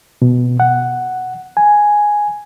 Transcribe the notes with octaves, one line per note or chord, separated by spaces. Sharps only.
B2
F#5
G#5